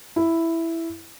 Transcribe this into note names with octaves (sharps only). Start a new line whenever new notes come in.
E4